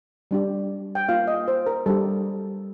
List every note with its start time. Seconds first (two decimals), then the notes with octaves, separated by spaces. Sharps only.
0.31 G3 D4 G4
0.95 G5
1.09 A#3 F4 F5
1.28 D#5
1.48 C5
1.67 A#4
1.86 G3 D4 G4 A4